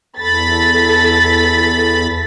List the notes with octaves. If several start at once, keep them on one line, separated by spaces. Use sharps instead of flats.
E2 A4 B5 A6 B6